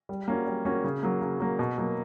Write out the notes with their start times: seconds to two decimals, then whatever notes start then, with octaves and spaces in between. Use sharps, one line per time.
0.09 G3
0.28 A#3 C#4 F#4
0.47 G3
0.65 A#3 C#4 F#4
0.84 C#3
1.03 F#3 A#3
1.22 C#3
1.40 F#3 A#3
1.59 B2
1.78 F#3 A#3